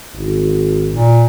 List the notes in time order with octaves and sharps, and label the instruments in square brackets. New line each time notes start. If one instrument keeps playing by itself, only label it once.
[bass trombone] G#1
[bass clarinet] A#2